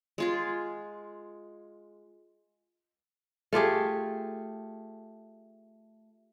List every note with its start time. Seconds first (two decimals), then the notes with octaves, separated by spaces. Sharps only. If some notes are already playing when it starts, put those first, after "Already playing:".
0.18 G#3 F4 G#4
3.53 A3 F4 G4 G#4